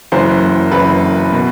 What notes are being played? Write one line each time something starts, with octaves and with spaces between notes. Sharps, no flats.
F#1 F#2 E3 C5
F#1 F#2 E3 B4
B2